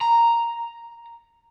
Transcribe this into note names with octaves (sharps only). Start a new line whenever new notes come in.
A#5